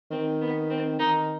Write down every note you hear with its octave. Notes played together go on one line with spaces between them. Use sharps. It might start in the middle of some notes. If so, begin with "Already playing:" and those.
D#3 C4
B3
C4
D#3 D#4